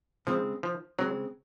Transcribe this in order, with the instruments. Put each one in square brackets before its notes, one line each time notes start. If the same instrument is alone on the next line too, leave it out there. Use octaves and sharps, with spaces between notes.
[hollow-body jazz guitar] C#3 G#3 C4 [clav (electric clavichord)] F3
[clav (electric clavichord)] F3
[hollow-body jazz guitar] C#3 G#3 C4 [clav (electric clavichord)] F#3